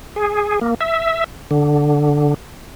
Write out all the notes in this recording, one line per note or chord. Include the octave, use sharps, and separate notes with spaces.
G#4
A#3
E5
D3